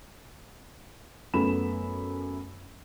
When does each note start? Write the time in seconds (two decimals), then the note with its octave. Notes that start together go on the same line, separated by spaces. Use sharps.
1.34 F#2 A3 B3 B5 E7